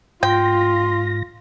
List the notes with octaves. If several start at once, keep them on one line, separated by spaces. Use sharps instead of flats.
G#2 F4 G5 C6 A#6